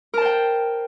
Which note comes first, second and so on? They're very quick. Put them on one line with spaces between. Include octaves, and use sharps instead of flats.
A#4 A5 C5 G5